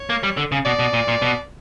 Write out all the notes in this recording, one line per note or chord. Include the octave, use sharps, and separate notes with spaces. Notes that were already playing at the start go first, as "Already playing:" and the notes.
Already playing: C#5
A#3
G3
D3
C#3
B2 D5
B2
A#2
A#2
B2